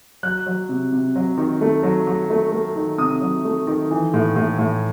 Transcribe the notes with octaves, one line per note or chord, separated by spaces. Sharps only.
F#3 F#6
F#3
C3
C3
F#3
D#3
A3
F#3
F#3
A3
A3
D#3
C3 D#6
F#3
A3
D#3
E3
A2
A2
A2